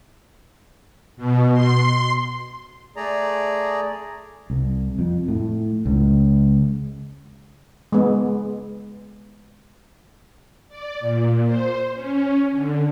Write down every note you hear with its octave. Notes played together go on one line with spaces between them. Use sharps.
B2
C6
A3 G#4 D5 A#5
C2
F2
A2
C#2
G#3 B3
D5
A#2
C5
C#4
D3